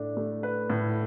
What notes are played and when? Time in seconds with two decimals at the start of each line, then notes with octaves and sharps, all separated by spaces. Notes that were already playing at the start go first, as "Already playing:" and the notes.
Already playing: A2 A3 D4
0.17 A3
0.43 B4
0.70 A2